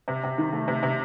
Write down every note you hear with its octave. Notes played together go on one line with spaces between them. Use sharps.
C3
C3
D#3
A3
C3
C3